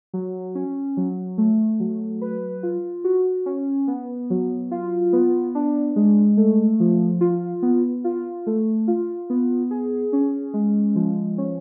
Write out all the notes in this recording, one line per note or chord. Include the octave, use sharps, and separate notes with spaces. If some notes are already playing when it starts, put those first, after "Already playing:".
F#3
C#4
F#3
A3
F#3
B4
F4
F#4
C#4
B3
F#3
F4
B3
D4
G#3
A3
F3
F4
B3
F4
A3
F4
B3
G#4
C#4
G#3
F3
C#4